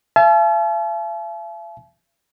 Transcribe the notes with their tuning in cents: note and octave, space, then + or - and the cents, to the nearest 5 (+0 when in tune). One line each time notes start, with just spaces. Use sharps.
E5 +45 A5 -45